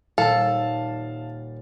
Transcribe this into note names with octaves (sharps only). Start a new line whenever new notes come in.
D#1 A4 F5 A5